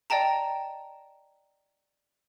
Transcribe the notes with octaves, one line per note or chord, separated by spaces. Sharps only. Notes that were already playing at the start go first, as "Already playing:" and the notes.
D5 D#5 G5 A5 A#5